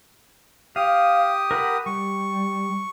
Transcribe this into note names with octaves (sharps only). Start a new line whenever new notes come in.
G4 F5 D#6
A#4 F#5 B5
G3 C#6